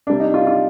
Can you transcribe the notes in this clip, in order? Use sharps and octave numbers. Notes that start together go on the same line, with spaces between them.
C3 G3 D4
D#4
F4
F4